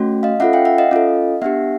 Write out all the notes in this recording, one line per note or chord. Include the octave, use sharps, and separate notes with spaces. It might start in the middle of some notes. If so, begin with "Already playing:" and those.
Already playing: A3 C#4 F#4
D#5 F5
C#4 F4 A4 E5 F#5
F5 G5
E5 F#5
D#5 F5
C#4 F4 A4
B3 D4 G4 E5 F#5